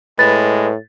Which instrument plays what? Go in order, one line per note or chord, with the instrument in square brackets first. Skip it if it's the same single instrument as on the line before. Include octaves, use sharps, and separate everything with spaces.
[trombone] A2 [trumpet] G#3 [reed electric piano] B4 [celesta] A6